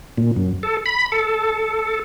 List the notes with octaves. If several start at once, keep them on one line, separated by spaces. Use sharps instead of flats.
A#2
F#2
A4
B5
A4